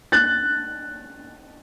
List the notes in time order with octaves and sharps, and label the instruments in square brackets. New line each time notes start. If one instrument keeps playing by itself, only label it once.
[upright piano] F#6 A6